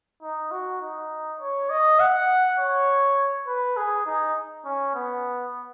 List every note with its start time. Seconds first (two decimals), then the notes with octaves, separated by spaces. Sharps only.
0.23 D#4
0.51 F#4
0.82 D#4
1.41 C#5
1.70 D#5
2.00 F#5
2.59 C#5
3.47 B4
3.77 G#4
4.06 D#4
4.65 C#4
4.95 B3